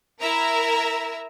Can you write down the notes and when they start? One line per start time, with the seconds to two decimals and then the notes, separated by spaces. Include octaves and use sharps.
0.20 E4 A#4 E5 A#5